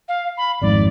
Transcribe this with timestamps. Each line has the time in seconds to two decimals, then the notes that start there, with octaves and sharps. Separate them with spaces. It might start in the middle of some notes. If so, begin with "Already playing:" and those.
0.09 F5
0.37 B5
0.61 G#1 F2 G#2 D5